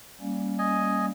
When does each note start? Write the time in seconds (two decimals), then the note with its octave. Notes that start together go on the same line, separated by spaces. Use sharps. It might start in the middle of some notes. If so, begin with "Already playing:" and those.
0.21 G3 A#3 C#4
0.59 D#5 G#5